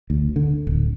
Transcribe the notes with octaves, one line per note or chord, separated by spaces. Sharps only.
D2
D3
D1